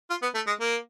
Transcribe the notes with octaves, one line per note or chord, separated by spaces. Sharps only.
F4
B3
A3
G#3
A#3